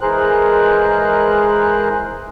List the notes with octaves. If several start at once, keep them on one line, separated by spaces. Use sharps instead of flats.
E3 G#3 G#4 A#4 C5 F#6